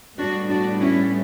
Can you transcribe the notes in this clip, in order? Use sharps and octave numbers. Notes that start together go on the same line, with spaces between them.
A2 G3 B3 D4 F#4
D4 F#4
C#4 E4